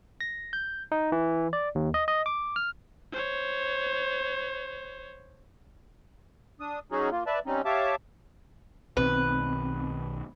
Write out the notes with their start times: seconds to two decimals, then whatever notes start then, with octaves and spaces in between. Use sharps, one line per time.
0.21 A#6
0.53 G6
0.92 D#4
1.12 E3
1.53 D5
1.75 D#2
1.94 D#5
2.08 D#5
2.26 D6
2.56 F6
3.12 C5 C#5
6.60 D4 D#6
6.92 F#3 C#4 D#4 F#4 G#4
7.12 A#3 F4
7.27 B4 D5 E5 A5
7.46 G3 C4 C#4 D#4
7.65 G4 C#5 E5 F5 A5 D6
8.97 B1 B2 D#3 C4 B4